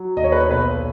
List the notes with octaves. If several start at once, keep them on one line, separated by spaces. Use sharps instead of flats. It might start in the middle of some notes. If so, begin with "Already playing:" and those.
Already playing: F#3
D#2 D#5
C#5
B4
C#5
B1 B4